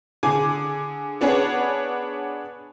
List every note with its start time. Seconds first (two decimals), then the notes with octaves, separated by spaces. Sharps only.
0.23 D3 G#4 G#5 D6
1.21 B3 D4 G#4 B4 C#5 F#5